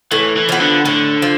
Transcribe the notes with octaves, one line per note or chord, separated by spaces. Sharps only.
A2 E3
E3
F3 B3
D3
A2 D3
F3